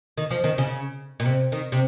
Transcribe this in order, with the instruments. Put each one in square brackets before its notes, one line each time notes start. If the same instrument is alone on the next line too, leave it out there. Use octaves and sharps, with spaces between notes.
[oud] D#3
F3
D#3
C#3
A#2
C3
D#3
C3